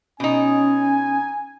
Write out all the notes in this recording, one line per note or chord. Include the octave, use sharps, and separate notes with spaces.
B2 C#4 D#4 G#5